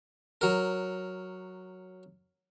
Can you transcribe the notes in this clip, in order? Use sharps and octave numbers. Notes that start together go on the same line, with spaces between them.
F#3 A#4